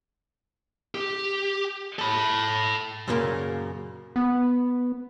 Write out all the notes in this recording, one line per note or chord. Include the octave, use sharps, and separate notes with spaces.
G4
A4 B5
F#2 A#2 C#3 A#3
B3